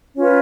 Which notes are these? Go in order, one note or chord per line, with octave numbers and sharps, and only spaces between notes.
C#4 F4 B4 C#5